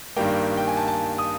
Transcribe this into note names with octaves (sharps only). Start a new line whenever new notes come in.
G2 D#3 G3 A#3 G5
G5
G#5
A5
A5
D#6